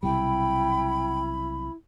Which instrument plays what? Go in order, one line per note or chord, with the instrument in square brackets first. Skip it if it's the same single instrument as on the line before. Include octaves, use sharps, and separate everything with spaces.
[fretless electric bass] B1 C3 G3 [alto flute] E4 [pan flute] G5 [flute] B5